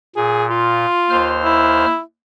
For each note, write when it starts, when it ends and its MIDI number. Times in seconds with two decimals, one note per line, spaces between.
0.16 0.86 46
0.16 0.45 68
0.50 1.37 65
1.10 1.85 39
1.10 1.85 72
1.10 1.85 89
1.44 2.00 64